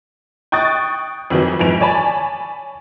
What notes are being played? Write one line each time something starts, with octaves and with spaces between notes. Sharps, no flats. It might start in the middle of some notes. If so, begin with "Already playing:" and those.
G5 C#6 D#6 F#6 A6
F2 D#3 E3 F#3
F2 G#2 E3 D7 F7
C#5 D5 G#5 A5 B5